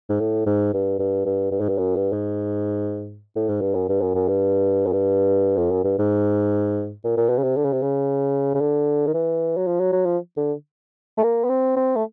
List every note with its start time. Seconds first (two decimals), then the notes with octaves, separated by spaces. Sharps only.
0.09 G#2
0.20 A2
0.46 G#2
0.73 G2
0.99 G2
1.25 G2
1.51 G2
1.60 G#2
1.69 G2
1.78 F#2
1.96 G2
2.12 G#2
3.35 A2
3.49 G#2
3.61 G2
3.74 F#2
3.89 G2
4.01 F#2
4.15 F#2
4.28 G2
4.86 F#2
4.93 G2
5.57 F2
5.71 F#2
5.84 G2
5.98 G#2
7.04 A#2
7.17 A#2
7.29 B2
7.38 C#3
7.43 C3
7.56 D3
7.64 C#3
7.72 C3
7.82 C#3
8.54 C#3
8.60 D3
9.07 D#3
9.14 E3
9.57 F#3
9.67 F3
9.80 F#3
9.92 F#3
10.05 F3
10.37 D3
11.18 A3
11.23 A#3
11.44 B3
11.49 C4
11.76 C4
11.96 A3